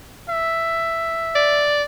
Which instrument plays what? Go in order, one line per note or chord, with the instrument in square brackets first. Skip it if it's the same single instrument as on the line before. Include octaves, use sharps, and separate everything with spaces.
[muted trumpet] E5
[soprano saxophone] D5